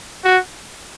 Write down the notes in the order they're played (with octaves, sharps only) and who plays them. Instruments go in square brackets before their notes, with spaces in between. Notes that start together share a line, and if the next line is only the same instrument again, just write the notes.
[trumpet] F#4